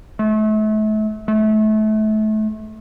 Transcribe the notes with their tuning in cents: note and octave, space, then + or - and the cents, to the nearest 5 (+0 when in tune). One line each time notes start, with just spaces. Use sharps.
A3 -35
A3 -30